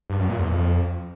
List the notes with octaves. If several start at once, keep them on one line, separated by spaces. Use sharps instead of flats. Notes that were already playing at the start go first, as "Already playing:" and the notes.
G2
F#2
A#2
E2
F2